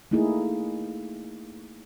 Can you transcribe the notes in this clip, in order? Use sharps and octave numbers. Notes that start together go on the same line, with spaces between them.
A3 A#3 D#4 E4 G#4